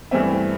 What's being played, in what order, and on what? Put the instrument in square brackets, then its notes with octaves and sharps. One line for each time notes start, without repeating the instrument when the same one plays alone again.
[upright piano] G2 E3 A3 C4 E5